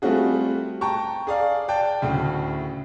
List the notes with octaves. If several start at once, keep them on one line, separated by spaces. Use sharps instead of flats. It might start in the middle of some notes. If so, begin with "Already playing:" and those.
G3 A3 C4 F4 F#4 G#4
G5 A5 A#5 C#6
G#4 D5 F5
D5 G5 A5
D2 A2 C#3